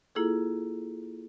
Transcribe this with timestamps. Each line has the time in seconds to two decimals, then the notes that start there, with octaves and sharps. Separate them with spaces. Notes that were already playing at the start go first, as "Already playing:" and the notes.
0.15 A#3 E4 F4 G#4 A4